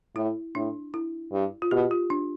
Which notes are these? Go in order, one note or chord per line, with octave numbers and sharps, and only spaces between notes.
A2 E4
A2 D4
E4
G2
F4
B2 G4
F4
D4